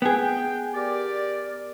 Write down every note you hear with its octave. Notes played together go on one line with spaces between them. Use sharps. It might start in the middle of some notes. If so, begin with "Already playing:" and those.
B3 G#4 G5
G4 A#4 D5